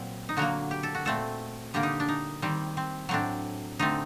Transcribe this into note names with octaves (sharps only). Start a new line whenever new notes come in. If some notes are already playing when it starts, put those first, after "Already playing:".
Already playing: A#2 F#3 C4
D#4
D3 F#3 A#3 F#4
G4
A4
F#4
A#2 A3 C4 A4
D3 G3 A#3 G4
D#4
D4
D#4
D#3 G3 C4
C4
A2 F#3 C4 D4
D3 A3 C4 D#4